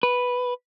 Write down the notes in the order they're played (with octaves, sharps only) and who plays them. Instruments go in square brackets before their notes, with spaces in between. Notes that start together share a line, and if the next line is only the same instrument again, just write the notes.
[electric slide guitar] B4